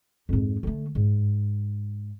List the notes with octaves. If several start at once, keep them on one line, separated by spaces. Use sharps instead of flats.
F2 G#2
D3 A3
G#2